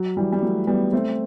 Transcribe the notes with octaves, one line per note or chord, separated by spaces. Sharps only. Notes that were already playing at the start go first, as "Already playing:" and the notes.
Already playing: F#3
E3 G3
G3
F#3 A3
G3 B3
A3 C4